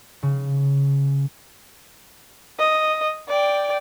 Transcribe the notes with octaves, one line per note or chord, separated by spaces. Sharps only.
C#3
D#5
D5 G5